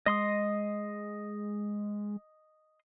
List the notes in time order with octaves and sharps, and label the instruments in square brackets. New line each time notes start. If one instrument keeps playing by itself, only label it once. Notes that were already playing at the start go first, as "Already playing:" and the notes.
[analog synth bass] G#3 [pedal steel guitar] D#5 C6 D#6